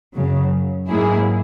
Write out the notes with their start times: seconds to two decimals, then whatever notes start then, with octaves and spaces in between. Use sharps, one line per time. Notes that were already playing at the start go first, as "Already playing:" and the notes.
0.15 F#2 C#3 F#3
0.90 G#2 F#3 A#3 E4 G#4